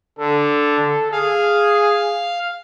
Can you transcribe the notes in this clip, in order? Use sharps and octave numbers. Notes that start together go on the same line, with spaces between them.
D3 A4
G#4 F5